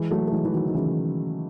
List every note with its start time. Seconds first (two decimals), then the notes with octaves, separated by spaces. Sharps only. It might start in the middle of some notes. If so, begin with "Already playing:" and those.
Already playing: E3 G#3
0.11 F#3 A3
0.27 A3
0.32 E3 G#3
0.45 E3
0.53 D#3 F#3
0.67 D#3
0.74 C#3 E3